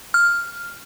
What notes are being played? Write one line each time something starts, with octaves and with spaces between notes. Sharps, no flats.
F6